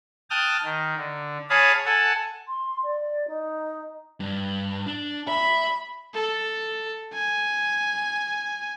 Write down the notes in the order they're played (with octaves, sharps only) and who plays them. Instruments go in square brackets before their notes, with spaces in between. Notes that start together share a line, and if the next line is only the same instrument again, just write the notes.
[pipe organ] G5 A5 D#6 F6 F#6
D#3
D3
G#4 C#5 F5 A5 B5 D#6
A4 F#5 G#5 A5
[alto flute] C6
D5
D#4
[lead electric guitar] G2
D4
[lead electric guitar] E5 [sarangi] B5
[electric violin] A4
G#5